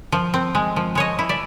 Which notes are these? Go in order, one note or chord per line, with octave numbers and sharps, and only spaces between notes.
F3
C4
G#3
F3
G#3 C#5 D#5
E4
D5 E5